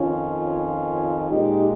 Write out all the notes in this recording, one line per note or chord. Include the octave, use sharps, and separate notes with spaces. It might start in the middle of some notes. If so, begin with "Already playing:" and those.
Already playing: F2 D#3 C#4 F4
A#2 G#3 D#4 G4